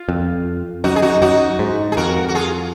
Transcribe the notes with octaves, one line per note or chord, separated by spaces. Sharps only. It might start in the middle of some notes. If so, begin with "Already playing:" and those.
Already playing: F4
F2
F#2 D#4 F#4
G#4
D#4 F#4
F#2 D#4 F#4
G#2
G#4
F2 F#4 A#4
F#4
F4 G#4